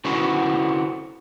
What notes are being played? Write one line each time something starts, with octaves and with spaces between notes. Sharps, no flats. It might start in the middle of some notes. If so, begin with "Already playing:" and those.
D3 C#4 E4 F#4 B4 C5